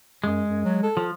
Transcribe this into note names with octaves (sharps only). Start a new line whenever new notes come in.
F#2 G#3
F#2
F#3
A4
F3